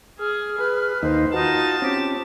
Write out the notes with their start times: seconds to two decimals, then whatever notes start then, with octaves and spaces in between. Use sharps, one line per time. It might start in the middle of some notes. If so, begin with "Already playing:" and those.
0.19 G#4 F6
0.59 G#4 B4
1.03 D#2 A#3 D#4 C5
1.33 D#4 F4 F#4 A5
1.82 C4 C#4 G4